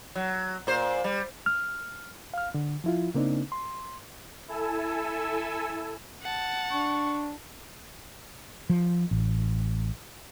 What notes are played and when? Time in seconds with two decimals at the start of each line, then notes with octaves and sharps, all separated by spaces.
0.15 F#3
0.67 A#2 C5
1.04 G3
1.46 F6
2.34 F5 F6
2.54 D3
2.84 F3 E4 F4
3.14 C#3 A#3 C4 D4 D#4
3.52 C6
4.48 E4 A4 G#5 E6
6.22 F#5 A5
6.71 D4 C#6
8.70 F3
9.11 A1